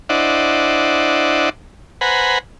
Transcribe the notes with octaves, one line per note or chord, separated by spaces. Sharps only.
D4 E4 C5 D5 D#5 F#5
B4 C5 F#5 G#5 A#5 B5